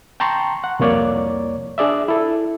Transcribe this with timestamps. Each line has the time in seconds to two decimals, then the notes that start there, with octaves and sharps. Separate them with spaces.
0.20 G5 A5 A#5 C6 C#6
0.64 F#5
0.79 C2 F2 A#3 C#5 D5
1.78 D4 G#4 D5 E5
2.08 E4 A4